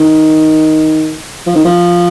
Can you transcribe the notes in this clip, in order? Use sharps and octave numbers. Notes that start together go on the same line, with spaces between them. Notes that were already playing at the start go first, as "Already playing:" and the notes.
Already playing: D#3
F3
D#3
F3